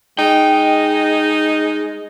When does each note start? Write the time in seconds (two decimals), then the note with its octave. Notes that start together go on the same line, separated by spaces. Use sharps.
0.19 G#3 D#4 G5